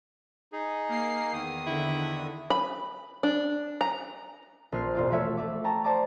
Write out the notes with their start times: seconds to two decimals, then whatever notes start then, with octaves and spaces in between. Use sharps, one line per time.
0.53 D#4 G#4
0.89 A#3 C7
1.33 E2 D#3 D#6
1.67 D3 E4
2.50 B5
3.23 D4
3.81 A#5
4.72 A#1 C5 F6 C7
4.95 E1 F4 D5
5.10 F3 A3 F4 F#4 C#5 E5
5.37 A3 E5 D6
5.64 G5 A5 A#5 C#6
5.84 C5 D5 A5 A#5 D6